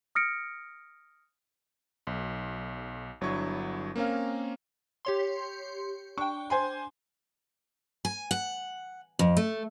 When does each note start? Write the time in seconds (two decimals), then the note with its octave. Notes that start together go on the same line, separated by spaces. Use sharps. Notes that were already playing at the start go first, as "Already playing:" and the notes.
0.15 D#6 F6 A#6 C#7 D7
2.07 B1
3.21 G1 F#3 D4 E4 C#6 G#6
3.96 A#3 C4 C#4 A#4 F5
5.05 G4 C#5 C6
6.18 D4 G5 C#6
6.50 C5 G#5 C6
8.05 G#5
8.31 F#5
9.19 F2
9.37 A3